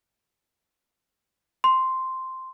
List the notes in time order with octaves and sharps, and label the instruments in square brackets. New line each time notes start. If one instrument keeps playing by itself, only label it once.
[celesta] C6